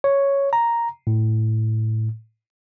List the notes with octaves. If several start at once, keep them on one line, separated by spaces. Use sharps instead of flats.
C#5
A#5
A2